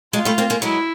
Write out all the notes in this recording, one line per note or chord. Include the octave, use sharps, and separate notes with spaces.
F#3 G#3 F4
G3 A3
A#3 C4
G#3 A#3
F#3 G#3 E4